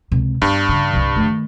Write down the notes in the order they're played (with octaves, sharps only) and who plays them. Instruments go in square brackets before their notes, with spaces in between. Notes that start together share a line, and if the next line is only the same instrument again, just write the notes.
[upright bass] C#2 C3
[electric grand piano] G2 [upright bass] B3
[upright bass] C#3
C2 C3
D#3 A3